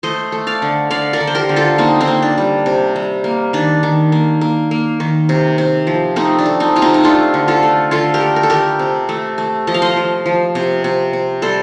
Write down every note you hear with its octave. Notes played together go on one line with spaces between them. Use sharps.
A3 C5 D#5
A3
D5 F5
D3
D3 D5 F5
A#4 D5
D3
C5
G4 A#4
D3
F4 A4
A#3 C4 D#4
C4 D#4
A#3
D4
G3
C3
G3
A#3
D#3 D4
D#3
A#3
A#3
A#3
D#3
C3
C3
F3
A3 C4 D#4
D4
A3
C4 D#4
C3 F4
C4 D#4
D#4
A3 D4 F4
D3
F4 A4
A3
D3 F4 A4
G4 A#4
A3
A#4
A4
A3 G4 A#4
C3
A3
A3
F3 D#5
F5
C5 D#5
F3
F3
C3
C3
C3
G3 A4 C5